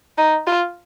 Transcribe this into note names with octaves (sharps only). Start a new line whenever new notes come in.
D#4
F4